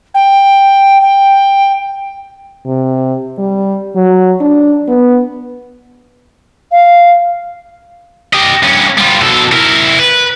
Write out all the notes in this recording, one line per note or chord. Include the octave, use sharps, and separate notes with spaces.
G5
G5
C3
G3
F#3
D4
B3
F5
G4 D#5
G2 C#4
G3 F4
B2 A4
E4 A#4
B4